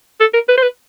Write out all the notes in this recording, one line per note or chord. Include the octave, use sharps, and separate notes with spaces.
A4
A#4
B4
C5
B4